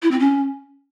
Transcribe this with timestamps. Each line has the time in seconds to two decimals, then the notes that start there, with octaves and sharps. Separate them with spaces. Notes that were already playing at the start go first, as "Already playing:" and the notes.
0.03 E4
0.11 C4
0.20 C#4